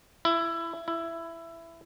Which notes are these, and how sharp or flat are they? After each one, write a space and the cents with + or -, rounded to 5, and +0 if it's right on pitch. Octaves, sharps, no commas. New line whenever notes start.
E4 +20
E4 +15